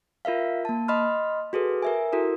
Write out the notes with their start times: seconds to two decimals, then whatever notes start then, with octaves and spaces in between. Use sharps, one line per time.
0.25 F4 A#4 E5 F5
0.65 A#3 A5
0.88 D#5 B5 C6 F6
1.53 F#4 G#4 A4 B4
1.82 A#4 E5 G#5
2.13 E4 F#4 A4 A#4